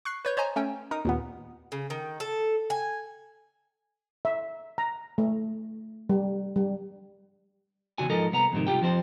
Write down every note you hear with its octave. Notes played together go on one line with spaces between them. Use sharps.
C#6 F#6 C7
B4 C#5 G6
C5 C#5 D#5 G#5 A#5
A3 C#4 G5
D#4 A#4 D#6
D#2 A#2 B3
C#3
D#3
A4
G#5
E5
A#5
A3
G3
G3
E2 G2 C#3 F#4 G#5
G#2 F3 A4 A#4 D#5
C2 B3 A#5
F2 G#2 C3 D#3
C2 F4 G4 G5
F2 F3 C4 C5